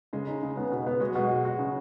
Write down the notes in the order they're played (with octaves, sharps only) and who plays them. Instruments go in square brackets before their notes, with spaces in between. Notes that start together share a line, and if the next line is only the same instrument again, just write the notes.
[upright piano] C#3 [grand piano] G#3
[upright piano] D#4
C#3
[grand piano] G#3 [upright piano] B3
[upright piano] B2
B3
[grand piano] G#3 [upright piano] F#4
[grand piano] F#3
[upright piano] B2 [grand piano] G#3
[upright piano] F#4
F#4
C#3